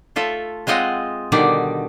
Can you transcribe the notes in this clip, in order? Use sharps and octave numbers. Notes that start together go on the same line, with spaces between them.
A3 F4 A4 E5
G#3 C4 F4 D#5 F#5
B2 D3 D#3 G3 D#4 D5